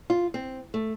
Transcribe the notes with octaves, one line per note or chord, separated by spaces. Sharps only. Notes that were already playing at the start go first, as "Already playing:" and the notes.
F4
C4
A3